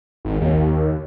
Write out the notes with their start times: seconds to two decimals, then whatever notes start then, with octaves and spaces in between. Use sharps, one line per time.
0.25 G#1
0.41 D#2